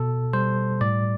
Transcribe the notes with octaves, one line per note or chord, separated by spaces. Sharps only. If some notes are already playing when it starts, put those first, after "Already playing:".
Already playing: B2 A4
G3 C5
A2 D5